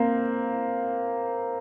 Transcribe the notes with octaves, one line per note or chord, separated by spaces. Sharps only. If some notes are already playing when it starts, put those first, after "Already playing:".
Already playing: A#3 C4